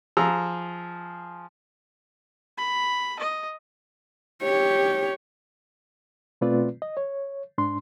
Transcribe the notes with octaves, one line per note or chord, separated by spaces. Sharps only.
F3 G#4 A#5 E6
B5
D#5
G4 C#5
B2 A3 C4 F4 B4 D5
D#5
C#5
G#2 D4 C6